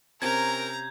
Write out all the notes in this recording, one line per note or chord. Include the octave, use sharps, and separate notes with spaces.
C3 C4 C#4 A#4 A#5 G6 G#6